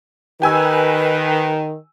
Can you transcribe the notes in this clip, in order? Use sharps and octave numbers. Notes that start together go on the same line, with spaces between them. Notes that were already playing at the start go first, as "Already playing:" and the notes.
D#3 G4 B4 G#5 E6